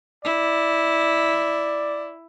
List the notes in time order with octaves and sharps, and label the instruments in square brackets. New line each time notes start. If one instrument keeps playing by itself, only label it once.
[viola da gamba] E4 [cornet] D5